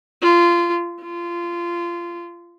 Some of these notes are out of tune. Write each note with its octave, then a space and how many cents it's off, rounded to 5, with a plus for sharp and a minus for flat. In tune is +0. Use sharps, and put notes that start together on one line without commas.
F4 -20
F4 -20